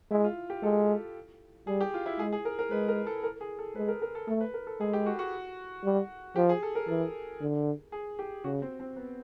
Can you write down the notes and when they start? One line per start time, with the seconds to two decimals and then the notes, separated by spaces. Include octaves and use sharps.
0.11 G#3 E4
0.24 F4
0.50 G4
0.63 G#3 A4
1.67 G3 G#4
1.81 G4
1.94 F4
2.06 E4
2.19 G#3 G#4
2.33 G#4
2.45 A#4
2.59 A#4
2.71 G#3 B4
2.88 A#4
3.07 A4
3.23 A#4
3.41 G#4
3.59 A4
3.75 G#3 B4
3.88 A#4
4.02 A#4
4.15 A4
4.28 A3 A4
4.41 B4
4.54 A#4
4.67 A4
4.80 G#3 G#4
4.93 G4
5.06 F#4
5.19 F#4
5.84 G3
6.36 F3 G4
6.49 G#4
6.63 A4
6.75 A#4
6.88 E3 A4
7.40 D3
7.92 G#4
8.19 G4
8.44 C#3 F#4
8.62 C4
8.80 C4
8.96 B3